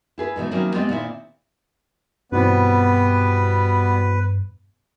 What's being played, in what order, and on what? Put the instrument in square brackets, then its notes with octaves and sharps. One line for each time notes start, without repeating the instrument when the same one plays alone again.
[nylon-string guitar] E4 G#4 B4
G#2 B2 E3 A3
D#3 F#3 A#3 C4 C#4 E4
G#3 B3 C4 F4 G4
A#2 D#3 C4 E4
[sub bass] G2 [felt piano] B2 E3 C4 [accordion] G3 B3 [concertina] B4